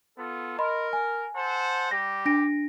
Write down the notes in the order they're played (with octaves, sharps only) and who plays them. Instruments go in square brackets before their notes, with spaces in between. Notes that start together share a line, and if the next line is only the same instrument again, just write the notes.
[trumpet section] B3 F4 A4
[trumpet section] A#4 [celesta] D#5 B5 C6
[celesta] G#5
[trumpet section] A4 C5 F#5
[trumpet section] G3 G4 [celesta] A#6
[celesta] D4 A#6 D7